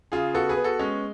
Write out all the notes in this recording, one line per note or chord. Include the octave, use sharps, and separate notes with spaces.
C#3 F4 G#4
B3 F#4 A4
G#4 B4
B3
F#4 A4
G#3 C#4